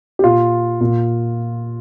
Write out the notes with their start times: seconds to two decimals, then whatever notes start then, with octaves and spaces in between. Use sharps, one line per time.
0.19 G4
0.24 A#2 F4
0.80 A#2